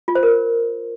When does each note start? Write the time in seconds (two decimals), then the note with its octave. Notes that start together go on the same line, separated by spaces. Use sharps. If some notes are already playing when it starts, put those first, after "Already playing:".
0.08 F4
0.15 C5
0.23 A#4